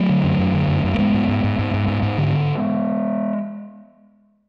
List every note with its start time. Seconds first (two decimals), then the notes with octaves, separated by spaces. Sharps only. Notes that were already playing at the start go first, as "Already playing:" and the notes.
Already playing: F#3 A3
0.10 D3
0.24 F#2
0.39 F#2
0.54 D3
0.68 F#2
0.84 F#2
0.94 A3
0.98 G#2 G#3 B3
1.14 G#2
1.29 G#2
1.44 G#2
1.59 G#2
1.74 G#2
1.88 G#2
2.03 G#2
2.18 D3